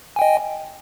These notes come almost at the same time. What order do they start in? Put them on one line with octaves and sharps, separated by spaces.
G#5 G5 D#5